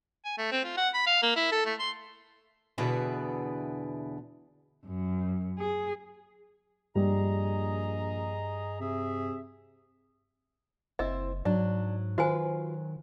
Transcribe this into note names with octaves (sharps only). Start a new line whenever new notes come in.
G#5
A3
C4
F4
F#5
B5
F5
A#3
E4
A4
A3
C6
E2 B2 D3 B3 E4 G#4
F#2
G#4
A#1 G2 G3 G#4 D#5 A#5
C3 G#4 E5
F#1 C4 E4 D#5
G#2 F#3 D4
D#3 F4 F#4 B4 C5 G#5